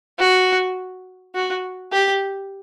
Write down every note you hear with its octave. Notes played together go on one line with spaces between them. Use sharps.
F#4
F#4
G4